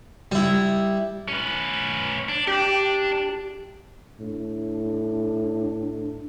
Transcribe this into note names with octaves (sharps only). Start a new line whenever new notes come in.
G3 E4
C#4 B4
D4
D4 G4
A2 D4